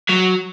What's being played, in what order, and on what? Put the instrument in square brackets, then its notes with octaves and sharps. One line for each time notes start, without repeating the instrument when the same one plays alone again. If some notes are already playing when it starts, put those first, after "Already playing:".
[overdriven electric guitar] F#3